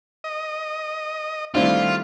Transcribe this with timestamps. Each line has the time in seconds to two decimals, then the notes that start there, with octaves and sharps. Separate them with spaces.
0.24 D#5
1.54 D#3 G3 A3 C4 D4 E4 F4